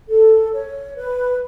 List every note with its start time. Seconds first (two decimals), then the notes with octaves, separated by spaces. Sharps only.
0.08 A4
0.53 C#5
0.96 B4